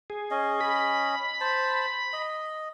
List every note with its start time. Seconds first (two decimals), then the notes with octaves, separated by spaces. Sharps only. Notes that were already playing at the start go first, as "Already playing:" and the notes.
0.10 G#4
0.31 C#4 D#5
0.61 B5
1.41 C5 A5
2.13 D#5